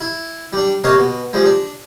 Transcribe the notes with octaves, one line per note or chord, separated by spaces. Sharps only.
E4
G3 D4
C3 A#3 C#5 D#5 F5
B2
F3 G3 G#3
D4